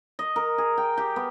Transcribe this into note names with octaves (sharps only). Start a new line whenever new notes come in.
D#5
A#4
G#4
G5
G4
B3